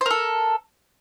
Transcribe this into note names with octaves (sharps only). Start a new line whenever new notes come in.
A4 A#4 C5